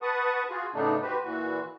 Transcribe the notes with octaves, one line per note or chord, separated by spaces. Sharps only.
B4 F#5 A5 C#6 D#6
F4 F#4 G#4
A2 C#3 A3 B3 D4 D#4
F#4 G4 B4 C5
A#2 E3 F#4